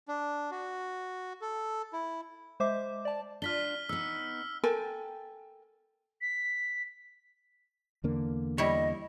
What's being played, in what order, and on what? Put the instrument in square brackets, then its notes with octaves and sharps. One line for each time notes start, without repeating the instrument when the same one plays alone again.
[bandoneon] D4
F#4
A4
E4
[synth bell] G#3 C5 E5 D6
D5 A5
[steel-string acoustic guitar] D4 F4 [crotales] F6 B6 G7
[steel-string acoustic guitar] B3 D#4 [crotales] E6
[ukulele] A4 A#4 G5 G#5
[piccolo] B6
[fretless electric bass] E2 D3 A#3
[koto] G3 E4 C#5 [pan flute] D#5